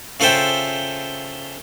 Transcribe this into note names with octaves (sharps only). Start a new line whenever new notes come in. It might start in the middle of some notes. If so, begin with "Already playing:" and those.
C#3 F4 A4 C5 E5 G5